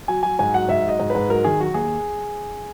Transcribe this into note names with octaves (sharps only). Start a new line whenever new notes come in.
F#3 G#5
F#3 G#5
G#2 G#5
F#3 F#5
G#2 E5
F#3 D#5
G#2
B4
G#2
F#3 A#4
D#3 G#4
F#3 F#4
D#2 G#4